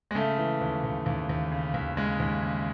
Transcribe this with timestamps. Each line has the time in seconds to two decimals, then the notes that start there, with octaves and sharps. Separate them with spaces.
0.11 G#3
0.15 C#3 A3
0.38 E3
0.61 D#2
0.84 D#2
1.06 D#2
1.29 D#2
1.52 C#3
1.74 D#2
1.97 C#3 G#3
2.20 D#2
2.42 C#3